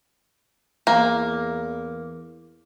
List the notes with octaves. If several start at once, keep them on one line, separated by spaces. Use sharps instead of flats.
E2 A#3